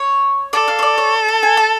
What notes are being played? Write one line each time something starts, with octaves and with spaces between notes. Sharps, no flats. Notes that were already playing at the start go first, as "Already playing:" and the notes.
Already playing: C#5
A4 D5
F5
C#5
D5
C#5
A5
G#5
A5